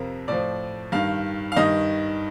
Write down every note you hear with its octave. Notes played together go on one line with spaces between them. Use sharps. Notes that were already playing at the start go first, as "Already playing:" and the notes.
Already playing: F2 C3 F3 A#4
A2 F3 D5
G2 D#3 F5
F5
G2 D#3 D#5